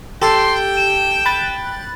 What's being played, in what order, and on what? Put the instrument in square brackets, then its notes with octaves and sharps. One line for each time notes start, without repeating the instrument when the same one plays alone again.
[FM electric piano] G4 [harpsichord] A4 [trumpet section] G5 [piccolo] C6
[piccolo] E7
[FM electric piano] B5 F#6 A6